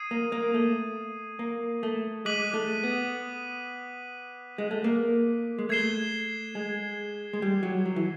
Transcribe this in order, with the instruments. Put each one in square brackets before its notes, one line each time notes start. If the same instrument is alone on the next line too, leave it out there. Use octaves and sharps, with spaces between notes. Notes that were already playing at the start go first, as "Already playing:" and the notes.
Already playing: [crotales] D#6 G#6 C7 D#7
[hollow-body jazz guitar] A#3
A#3
A3
A#3
A3
[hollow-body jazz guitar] G#3 [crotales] D6 F#6 B6 D#7 F#7
[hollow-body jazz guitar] A3
B3
G#3
A3
A#3
G#3
[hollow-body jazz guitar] A3 [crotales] G#6 C7 E7 G7
[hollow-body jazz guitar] G#3
G#3
G3
F#3
F#3
E3